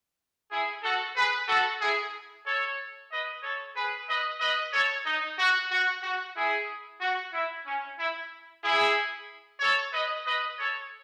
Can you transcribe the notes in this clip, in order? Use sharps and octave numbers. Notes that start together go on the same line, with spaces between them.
E4 G#4
F#4 A4
G#4 B4
F#4 A4
E4 G#4
A4 C#5
B4 D#5
A4 C#5
G#4 B4
B4 D#5
B4 D#5
A4 C#5
D#4
F#4
F#4
F#4
E4 G#4
F#4
E4
C#4
E4
E4 G#4
A4 C#5
B4 D#5
B4 D#5
A4 C#5